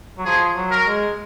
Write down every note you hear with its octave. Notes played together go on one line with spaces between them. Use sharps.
F#3
F3 G#4
F#3
A#4
G#3